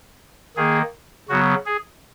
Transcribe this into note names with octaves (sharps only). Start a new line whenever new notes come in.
D#3 A#3 G#4
C#3 F#3 B3 F#4
G#4